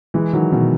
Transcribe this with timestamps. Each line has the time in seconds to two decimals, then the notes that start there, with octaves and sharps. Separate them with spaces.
0.14 E3 G#3
0.33 D#3 F#3
0.52 B2 D#3